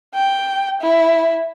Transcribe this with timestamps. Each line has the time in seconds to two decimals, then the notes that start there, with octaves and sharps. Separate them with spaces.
0.15 G5
0.81 E4